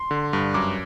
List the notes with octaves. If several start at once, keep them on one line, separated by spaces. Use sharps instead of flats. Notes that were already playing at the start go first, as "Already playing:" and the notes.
Already playing: C6
D3
G2
F#2 D6